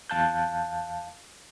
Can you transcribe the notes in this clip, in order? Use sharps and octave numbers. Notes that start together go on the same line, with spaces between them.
E2 F5 A5 F#6 G6